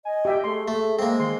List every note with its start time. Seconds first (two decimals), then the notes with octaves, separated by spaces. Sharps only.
0.05 D#5 G#5
0.25 G4 E5 G5
0.44 A3 G#4 C6
0.68 A3 E5
0.99 G#3 A#3 C4
1.20 D#3 C6